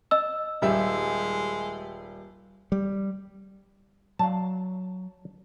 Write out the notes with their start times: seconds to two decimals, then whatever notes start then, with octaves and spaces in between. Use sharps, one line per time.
0.11 D#5 E6
0.62 D#1 G3 G#3 E5
2.72 G3
4.19 F#3 D5 F5 A5